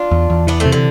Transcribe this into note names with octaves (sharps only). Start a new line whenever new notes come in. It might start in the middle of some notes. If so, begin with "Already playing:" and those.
Already playing: D4 F4
E2
E2
E3 B3 D4
A3 C4
C3
D3